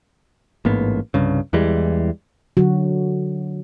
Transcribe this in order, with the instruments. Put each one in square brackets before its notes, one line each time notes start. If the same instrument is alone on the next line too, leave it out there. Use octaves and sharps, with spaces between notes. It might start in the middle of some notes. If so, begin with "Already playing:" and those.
[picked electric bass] A1 G#2 A#3 B3
C2 G2 C#3
E2 E3 G3 G#3
[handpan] D3 F#3 F#4